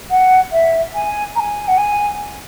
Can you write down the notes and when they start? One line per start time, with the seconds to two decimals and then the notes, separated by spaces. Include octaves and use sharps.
0.10 F#5
0.51 E5
0.94 G#5
1.35 A#5
1.39 G#5
1.67 F#5
1.77 G#5